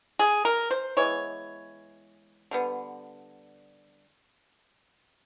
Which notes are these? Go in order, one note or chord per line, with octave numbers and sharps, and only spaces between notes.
G#4
A#4
C5
E3 G#3 B3 C#5
D3 G3 B3